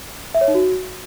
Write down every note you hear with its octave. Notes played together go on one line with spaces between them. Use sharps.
E5
C#5
D#4
F#4